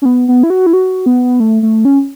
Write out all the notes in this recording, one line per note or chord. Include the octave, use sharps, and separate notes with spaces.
C#4
B3
B3
E4
F#4
E4
F#4
B3
A3
A3
C#4